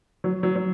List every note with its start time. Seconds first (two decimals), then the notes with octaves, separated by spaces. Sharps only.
0.24 F#3
0.43 F#3
0.56 F#3